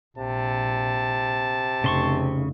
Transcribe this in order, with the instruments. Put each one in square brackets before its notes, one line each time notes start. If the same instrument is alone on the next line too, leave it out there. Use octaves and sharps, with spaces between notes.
[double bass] A#1 [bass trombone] C3 [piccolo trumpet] A5
[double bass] F1 [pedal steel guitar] C#3 C6 C#6